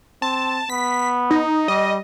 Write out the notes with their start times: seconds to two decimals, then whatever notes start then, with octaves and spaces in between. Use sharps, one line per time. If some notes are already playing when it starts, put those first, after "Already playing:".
0.22 C4 A5
0.70 B3 B6
1.31 D#4
1.68 G3 D#5